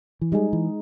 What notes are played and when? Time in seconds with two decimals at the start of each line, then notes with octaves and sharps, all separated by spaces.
0.21 E3
0.32 G3 G#3 D#4 G#4
0.53 E3